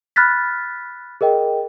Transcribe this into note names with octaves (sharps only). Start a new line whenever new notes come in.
B5 F6 F#6 A6 B6
G#4 A#4 D#5 G5